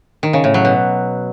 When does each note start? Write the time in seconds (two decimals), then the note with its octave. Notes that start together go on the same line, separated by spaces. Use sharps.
0.23 D#3
0.33 C#3
0.44 A2
0.54 F#3
0.65 B2